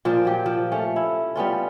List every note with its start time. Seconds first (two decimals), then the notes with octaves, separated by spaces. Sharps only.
0.05 A#2 F3 D5
0.25 F#3 G4
0.46 F3
0.72 A3 C#4
0.96 E4
1.36 G3 B3 C#4 F4